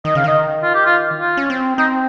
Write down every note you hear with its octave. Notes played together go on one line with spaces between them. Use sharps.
D#3 D#5
C#3 F5
D#3 D#5
F4
G4
F4
F4
C#4
C4
C4 D#4